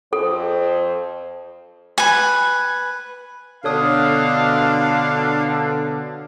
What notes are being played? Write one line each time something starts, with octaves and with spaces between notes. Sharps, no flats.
F2 A4 C5
B4 G#5
B2 D3 D4 A4 C#5 F5 D#6